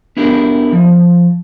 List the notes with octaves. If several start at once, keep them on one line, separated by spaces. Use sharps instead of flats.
B3 D4 E4 F#4 G4 A#4
F3